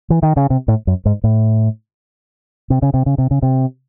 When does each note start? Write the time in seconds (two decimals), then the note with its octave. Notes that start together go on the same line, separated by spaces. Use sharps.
0.10 E3
0.23 D#3
0.37 C#3
0.50 C3
0.68 A2
0.87 F#2
1.06 G#2
1.24 A2
2.70 C3
2.82 C#3
2.94 C3
3.06 C#3
3.18 C3
3.31 C#3
3.43 C3